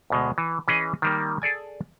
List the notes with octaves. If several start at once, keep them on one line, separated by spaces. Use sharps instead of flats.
D2 B2 G#3
E3
E3 C#4 G#4 D#5
D#3 G3 A#3
G#4 A4 D5 G#5